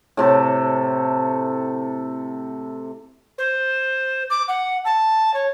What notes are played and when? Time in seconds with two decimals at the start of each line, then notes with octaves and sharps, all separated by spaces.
0.17 A2 C3 A4
3.38 C5
4.30 D6
4.48 F#5
4.85 A5
5.34 C#5